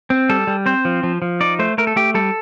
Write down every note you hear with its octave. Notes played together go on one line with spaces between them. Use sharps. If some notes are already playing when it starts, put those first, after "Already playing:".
C4
G3 A4
G3
C4 C5
F3
F3
F3
D#4 D5
A3 C5
A3 A#4
A4
A3 G4
G3 A4